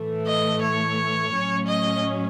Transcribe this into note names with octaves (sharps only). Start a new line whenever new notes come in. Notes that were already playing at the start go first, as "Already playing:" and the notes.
Already playing: A2 E3 A3
D#5
C#5
A2 F#3 C#4
D#5